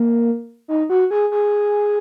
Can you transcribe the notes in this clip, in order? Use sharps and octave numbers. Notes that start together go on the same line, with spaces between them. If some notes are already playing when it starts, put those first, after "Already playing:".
Already playing: A#3
D#4
F#4
G#4
G#4